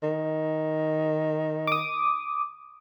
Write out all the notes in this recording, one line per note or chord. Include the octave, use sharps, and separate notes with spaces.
D#3
D6 D#6